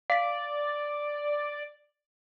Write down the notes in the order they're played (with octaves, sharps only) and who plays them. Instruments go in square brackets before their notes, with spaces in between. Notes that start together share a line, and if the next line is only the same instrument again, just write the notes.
[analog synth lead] D5 [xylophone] F5 B6